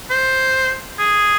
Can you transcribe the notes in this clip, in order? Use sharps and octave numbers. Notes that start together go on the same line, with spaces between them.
C5
G#4